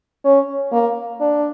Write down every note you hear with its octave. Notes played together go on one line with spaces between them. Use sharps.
C#4
A#3
D4